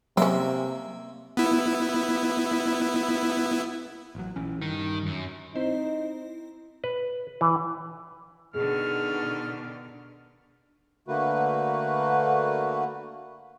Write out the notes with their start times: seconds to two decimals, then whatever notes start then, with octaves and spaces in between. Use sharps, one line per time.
0.17 C3 F#3 G#3 A#3 C#4 E5
1.37 B3 E4
4.15 A1 F#3
4.36 A#1 E3 C#4
4.62 G2 D#3
5.06 F#2
5.55 C4 D#4 E4 C5
6.84 B4
7.41 E3
8.54 B2 D3 D#3 G#4 F6
11.08 D3 A3 A#3 F#4 B4